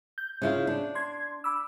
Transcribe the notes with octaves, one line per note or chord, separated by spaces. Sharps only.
G6
C#3 E4 F4
D4
C6 G#6
B5 D6 E6